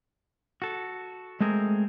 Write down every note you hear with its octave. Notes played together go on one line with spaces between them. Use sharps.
F#4 A4
G#3 A3 C4 G#4 A#4